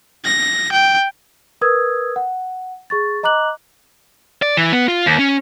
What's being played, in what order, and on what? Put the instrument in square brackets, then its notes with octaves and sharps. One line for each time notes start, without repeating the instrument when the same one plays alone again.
[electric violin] A#6
G5
[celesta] A#4 B4 D#6 E6 G#6
F#5
G#4 C#6 A6
D#5 A#5 D6 F#6 F#7
[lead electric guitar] D5
E3
B3
F4
D#2
C#4